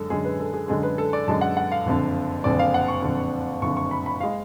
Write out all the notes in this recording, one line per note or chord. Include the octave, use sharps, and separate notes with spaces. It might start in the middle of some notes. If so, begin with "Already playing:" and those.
Already playing: F#2 D3 G#3 A4
F#2 D3 G#3 G#4
B4
A4
G#4
F#2 D3 G#3 G#4
B4
A4
D5
F#2 D3 G#3 A5
F#5
F#5
F5
F#1 F2 D3
F#1 F2 D3 D5
F5
F#5
C#6
F#1 F2 D3
F#1 F2 D3 C#6
C#6
B5
B5
G#3 F5